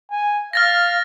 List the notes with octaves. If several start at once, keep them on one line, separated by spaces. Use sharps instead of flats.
G#5
F5 F6 A6 A#6